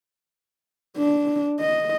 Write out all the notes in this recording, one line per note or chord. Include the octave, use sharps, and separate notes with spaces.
D4
D#5